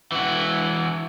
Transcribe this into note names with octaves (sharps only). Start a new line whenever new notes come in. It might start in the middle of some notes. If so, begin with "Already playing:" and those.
E3 F#4